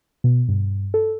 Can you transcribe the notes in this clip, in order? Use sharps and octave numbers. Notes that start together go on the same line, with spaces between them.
B2
G2
A4